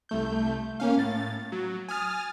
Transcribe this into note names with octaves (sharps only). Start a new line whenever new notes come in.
C2 A3 G6
A#3 C#4 F5
A2 A6
F#3
G#5 D#6 F6 A6